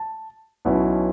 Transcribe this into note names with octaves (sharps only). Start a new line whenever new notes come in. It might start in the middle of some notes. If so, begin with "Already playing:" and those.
Already playing: A5
B1 B2 F#3 C#4 E4